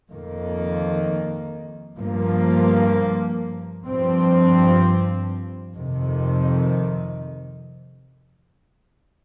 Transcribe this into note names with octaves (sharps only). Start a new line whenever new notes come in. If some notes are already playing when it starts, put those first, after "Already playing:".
F2 D#3 A#3
G2 F3 A#3
G2 F3 C4
F2 C3 D#3